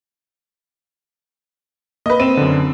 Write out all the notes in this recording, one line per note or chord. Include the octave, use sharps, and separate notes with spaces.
A#3 B4 D#5
C4 D#7 E7
F#2 D3